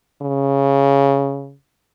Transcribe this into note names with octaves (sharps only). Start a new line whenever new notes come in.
C#3